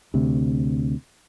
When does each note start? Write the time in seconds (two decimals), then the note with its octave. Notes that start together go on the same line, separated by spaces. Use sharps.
0.14 D2 C3